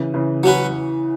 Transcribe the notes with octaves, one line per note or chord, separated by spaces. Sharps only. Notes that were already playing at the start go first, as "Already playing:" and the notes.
Already playing: C#3 E3
C#3 E3
F#3 C#4 F#4 B4